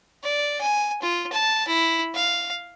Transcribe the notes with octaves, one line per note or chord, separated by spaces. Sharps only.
D5
G#5
F4
A5
E4
F5